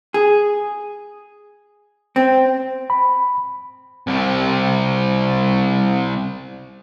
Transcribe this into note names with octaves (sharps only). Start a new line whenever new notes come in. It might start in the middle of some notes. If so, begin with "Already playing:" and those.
G#4
C4
B5
C2 C3